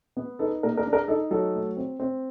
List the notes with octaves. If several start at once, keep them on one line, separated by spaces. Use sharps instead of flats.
B3
D#4 A4 B4
A#3 A#4
A#4
D4
A#4
D#4 A4
F#3 A4
A3
C4
C4